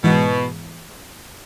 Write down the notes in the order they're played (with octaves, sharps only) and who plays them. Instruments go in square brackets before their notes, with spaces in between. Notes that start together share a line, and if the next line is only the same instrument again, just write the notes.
[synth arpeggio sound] G#2 E3 G#3 B3 [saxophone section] B2